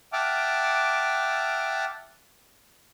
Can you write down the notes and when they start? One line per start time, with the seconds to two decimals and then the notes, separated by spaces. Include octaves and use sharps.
0.13 E5 F#5 G5 A5 D6 F6